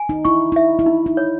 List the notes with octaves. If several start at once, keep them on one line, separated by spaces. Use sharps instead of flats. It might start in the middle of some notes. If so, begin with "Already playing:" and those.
Already playing: G#5
D#4
E4 C#6
E4 E5
E4
D#4
E4
C#5